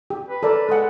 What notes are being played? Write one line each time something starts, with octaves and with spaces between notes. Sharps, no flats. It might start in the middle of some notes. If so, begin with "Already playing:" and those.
G4
B4
A4 A#4 D5
G#3 A4 F#5